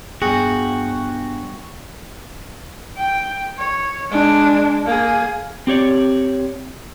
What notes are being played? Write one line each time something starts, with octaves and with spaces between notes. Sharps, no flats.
G2 B3 F#4 G#4 G5
G5
C#5
G#3 D4
A#3 G#4
C4 G4 C#5 D5